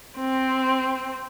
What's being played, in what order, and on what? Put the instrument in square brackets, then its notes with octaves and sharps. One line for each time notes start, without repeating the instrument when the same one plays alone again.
[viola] C4